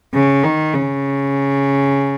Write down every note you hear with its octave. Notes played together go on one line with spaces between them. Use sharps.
C#3
D#3
C#3